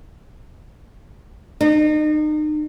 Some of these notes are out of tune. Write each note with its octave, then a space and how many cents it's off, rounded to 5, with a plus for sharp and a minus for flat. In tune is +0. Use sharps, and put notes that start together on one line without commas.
D#4 -35